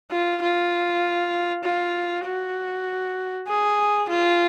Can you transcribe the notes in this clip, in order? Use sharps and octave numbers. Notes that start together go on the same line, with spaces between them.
F4
F4
F4
F#4
G#4
F4